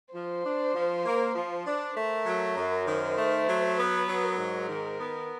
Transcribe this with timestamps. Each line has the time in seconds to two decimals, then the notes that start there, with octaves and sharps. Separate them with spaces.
0.14 F3 C5
0.44 D4
0.74 F3
1.06 A#3
1.35 F3
1.66 D4
1.96 A3 A#4
2.26 F#3
2.56 F#2
2.87 D#3 C5
3.17 A3
3.48 F#3
3.78 B3 B4
4.08 F#3
4.23 A#4
4.38 G#2
4.69 D#3
4.99 B3